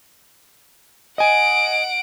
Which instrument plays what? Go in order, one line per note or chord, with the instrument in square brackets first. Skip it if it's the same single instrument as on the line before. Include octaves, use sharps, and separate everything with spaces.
[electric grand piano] D#5 G#5 [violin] F#5 D7